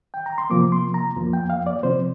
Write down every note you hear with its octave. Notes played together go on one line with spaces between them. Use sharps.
G5
A#5
C6
C3 F3 A#3 D6
C6
A#5
F2 F3 A#3
G5
F5
D5
C3 F3 C4 C5